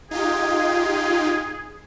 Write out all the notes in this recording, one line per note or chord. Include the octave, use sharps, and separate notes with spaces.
D#4 F4 G4 G#4